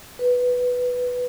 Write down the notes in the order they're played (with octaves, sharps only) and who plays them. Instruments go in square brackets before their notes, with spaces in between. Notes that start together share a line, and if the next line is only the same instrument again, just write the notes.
[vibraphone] B4